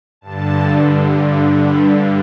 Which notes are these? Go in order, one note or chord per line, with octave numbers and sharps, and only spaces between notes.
G2 D3 A5
B5